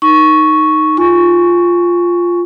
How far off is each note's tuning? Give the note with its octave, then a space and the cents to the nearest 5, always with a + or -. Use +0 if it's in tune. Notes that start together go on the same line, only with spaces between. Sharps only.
D#4 +0 C#6 +0
F4 +0 G#5 +0 C#6 +5